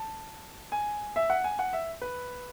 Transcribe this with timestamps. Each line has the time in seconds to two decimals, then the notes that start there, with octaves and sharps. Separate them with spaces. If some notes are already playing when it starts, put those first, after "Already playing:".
Already playing: A5
0.72 G#5
1.16 E5
1.30 F#5
1.44 G#5
1.59 F#5
1.73 E5
2.02 B4